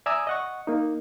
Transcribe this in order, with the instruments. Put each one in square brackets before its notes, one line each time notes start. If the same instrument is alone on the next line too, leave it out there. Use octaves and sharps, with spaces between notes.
[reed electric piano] D5 E5 G#5 A#5 D#6 E6
D#5 F#5 C#6
A#3 D#4